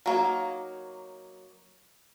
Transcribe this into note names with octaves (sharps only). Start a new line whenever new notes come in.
F#3 A#3 D#4